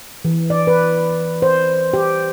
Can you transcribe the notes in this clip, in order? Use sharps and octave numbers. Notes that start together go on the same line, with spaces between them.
E3
D5
B4
C5
G4